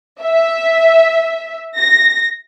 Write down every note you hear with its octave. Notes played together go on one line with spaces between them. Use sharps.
E5
A#6